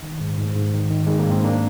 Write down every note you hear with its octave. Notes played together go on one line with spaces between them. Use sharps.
D#3
G#2
G#2
G#2
D#3
D#3
D#3 G#3
A#3
G#2
C4
A#3 D4